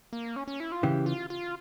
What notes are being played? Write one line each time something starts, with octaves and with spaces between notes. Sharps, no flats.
A#3
C#4
C#4
E4
F4
C#3 E3 G4
F4
F4